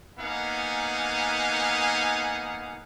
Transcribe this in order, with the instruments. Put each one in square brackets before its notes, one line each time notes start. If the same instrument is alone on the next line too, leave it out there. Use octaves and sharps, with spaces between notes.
[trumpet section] A#3 B3 D#4 F5 F#5 G#5